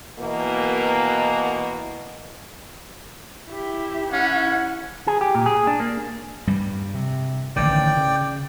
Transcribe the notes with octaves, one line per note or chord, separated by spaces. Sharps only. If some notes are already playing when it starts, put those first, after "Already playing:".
B2 E3 A#3
E4 G4
C#4 E4 F#5
G#4
G4
A#2
G#4
D4
A#3
G2 G3
C3
A1 D3 D#3 D5 G5
C#3